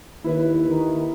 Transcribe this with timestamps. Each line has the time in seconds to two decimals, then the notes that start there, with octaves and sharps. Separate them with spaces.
0.24 D#2 E4 B4 E5
0.66 D#3